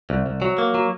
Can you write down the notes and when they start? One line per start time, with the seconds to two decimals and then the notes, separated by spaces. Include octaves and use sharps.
0.10 C2
0.26 C2
0.42 F#3
0.58 A#3
0.75 F#3